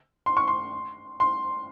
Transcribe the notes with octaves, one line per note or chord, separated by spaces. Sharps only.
C6
C#6
C6
C6